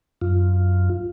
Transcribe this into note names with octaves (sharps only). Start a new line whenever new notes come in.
F#2 F4